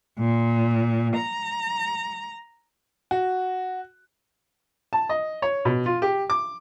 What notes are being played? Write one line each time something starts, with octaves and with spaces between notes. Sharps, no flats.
A#2
A#5
F#4
A5
D#5
C#5
B2
F4
G4
D6